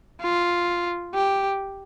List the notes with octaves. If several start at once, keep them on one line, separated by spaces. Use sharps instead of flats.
F4
G4